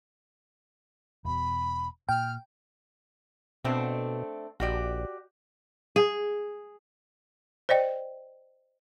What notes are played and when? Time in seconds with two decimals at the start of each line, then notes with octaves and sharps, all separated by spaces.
1.25 E1 B2 B5
2.09 A#2 G5 F6
3.64 B2 A3 C4 D4
4.60 A#1 F#4 G4 D5
5.96 G#4
7.69 C5 D5 D#5 G5